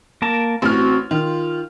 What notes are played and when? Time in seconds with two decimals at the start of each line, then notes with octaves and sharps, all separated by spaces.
0.22 A#3 A#4 A5
0.62 A1 C4 F#4 F6
1.11 D#3 F4